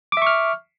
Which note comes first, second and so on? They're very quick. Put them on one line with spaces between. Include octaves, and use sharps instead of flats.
D6 E5 C#6 F6